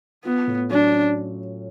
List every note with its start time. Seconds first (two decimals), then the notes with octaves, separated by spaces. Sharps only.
0.25 B3 F4
0.47 A2
0.71 F#3 D4
0.94 C#4